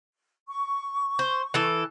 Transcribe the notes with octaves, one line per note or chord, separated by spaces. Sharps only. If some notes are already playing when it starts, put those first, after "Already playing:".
C#6
C5
E3 A4